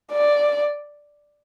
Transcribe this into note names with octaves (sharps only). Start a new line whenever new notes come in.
D5